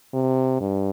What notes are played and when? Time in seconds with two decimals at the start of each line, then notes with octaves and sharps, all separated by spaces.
0.14 C3
0.60 G2